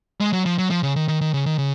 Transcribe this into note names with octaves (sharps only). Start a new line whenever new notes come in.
G#3
F#3
F3
F#3
F3
C#3
D#3
D#3
D#3
C#3
D#3
C#3